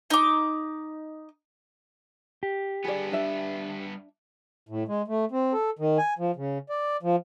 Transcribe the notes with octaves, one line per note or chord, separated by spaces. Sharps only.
D#4 D6
G4
G2 B3 G#4 D5
D4 E5
A2
G#3
A3
C4
A4
D#3
G#5
F3
C#3
D5
F3